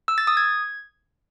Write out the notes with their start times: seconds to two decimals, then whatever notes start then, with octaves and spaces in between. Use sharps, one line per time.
0.08 E6
0.18 A6
0.27 D#6
0.37 G#6